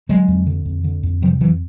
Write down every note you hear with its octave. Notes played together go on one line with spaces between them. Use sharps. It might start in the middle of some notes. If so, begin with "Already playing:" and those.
D3 F#3 G#3
F2
D3
F2
D3
F2
C3 F3 G3
F2 E3 F#3